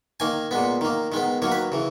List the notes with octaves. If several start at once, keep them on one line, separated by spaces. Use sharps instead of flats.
D#3 A#3 G#5
A#2 G#3 B3
D#3 A#3
D#3 G#3 B3
D#3 F#3 A#3 C#5
B4
C#3 E3